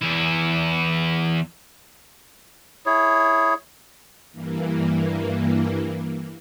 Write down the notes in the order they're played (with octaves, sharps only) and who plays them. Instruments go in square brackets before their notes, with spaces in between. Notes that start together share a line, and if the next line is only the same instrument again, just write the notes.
[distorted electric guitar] E2 E4
[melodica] E4 G#4 C#5
[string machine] G2 E3 A#3